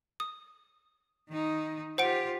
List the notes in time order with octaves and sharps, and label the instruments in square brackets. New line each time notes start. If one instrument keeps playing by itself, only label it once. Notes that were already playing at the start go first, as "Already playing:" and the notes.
[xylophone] D#6
[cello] D#3 D#4
[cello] F4 G4 [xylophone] C5 F#5 D7